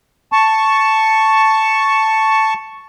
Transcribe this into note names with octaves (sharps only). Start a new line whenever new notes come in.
A5 C#6